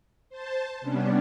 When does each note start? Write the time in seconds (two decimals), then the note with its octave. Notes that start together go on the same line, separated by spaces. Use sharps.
0.29 C5 A5
0.81 C3 G3 B3 C#4 D4